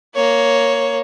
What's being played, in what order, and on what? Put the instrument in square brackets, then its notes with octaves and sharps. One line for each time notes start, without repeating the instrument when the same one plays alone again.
[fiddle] A#3 C#5